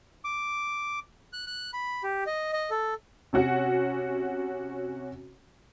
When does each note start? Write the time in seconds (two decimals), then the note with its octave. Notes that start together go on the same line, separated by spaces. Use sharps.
0.24 D6
1.33 F#6
1.47 F#6
1.73 B5
2.03 G4
2.27 D#5
2.53 D#5
2.70 A4
3.33 C3 C#4 F#4 F#5